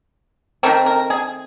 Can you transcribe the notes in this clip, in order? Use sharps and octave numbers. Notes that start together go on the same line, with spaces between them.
D#3 F#3 A3 C4 A#4
A#4
G#4